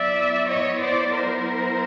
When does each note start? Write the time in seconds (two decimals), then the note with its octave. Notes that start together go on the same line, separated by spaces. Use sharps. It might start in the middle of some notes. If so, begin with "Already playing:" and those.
Already playing: F#3 B3 E4 D5 E5
0.48 C#5 D#5
0.81 C5 D5
1.14 A#4 C5